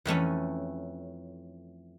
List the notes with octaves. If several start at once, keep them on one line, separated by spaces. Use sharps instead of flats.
F2 E3 A3 C#4